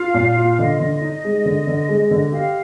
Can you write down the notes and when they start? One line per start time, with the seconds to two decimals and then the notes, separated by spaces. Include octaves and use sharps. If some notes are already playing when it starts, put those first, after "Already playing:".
Already playing: F4 F5
0.14 A#2
0.37 F4
0.58 D3 D#5
0.79 D3
1.02 D#4
1.24 G#3
1.45 D3
1.67 D3
1.89 G#3
2.11 D3
2.32 G4 F5